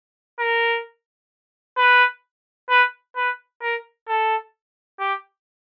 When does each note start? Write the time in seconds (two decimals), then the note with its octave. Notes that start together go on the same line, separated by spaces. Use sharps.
0.39 A#4
1.77 B4
2.70 B4
3.16 B4
3.62 A#4
4.08 A4
5.00 G4